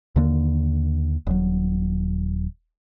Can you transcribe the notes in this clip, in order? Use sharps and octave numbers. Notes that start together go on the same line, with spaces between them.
D#2 D3 A#3
D#1 F#3